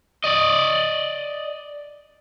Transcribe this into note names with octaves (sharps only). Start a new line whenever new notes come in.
D5 D#5